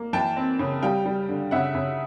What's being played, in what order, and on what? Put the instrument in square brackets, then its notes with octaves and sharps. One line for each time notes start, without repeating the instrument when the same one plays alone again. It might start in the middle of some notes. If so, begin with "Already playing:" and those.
Already playing: [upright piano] A#3
E3 G5 A5
C4
C#3
G3 F5 G5
G3
D3
C#3 E5 F#5
C#3